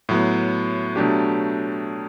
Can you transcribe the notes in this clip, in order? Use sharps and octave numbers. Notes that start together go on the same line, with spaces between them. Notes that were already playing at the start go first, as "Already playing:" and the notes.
A2 F#3 B3
B2 F#3 A3 D4 G4